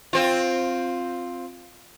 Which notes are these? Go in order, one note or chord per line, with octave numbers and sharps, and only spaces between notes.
C4 F4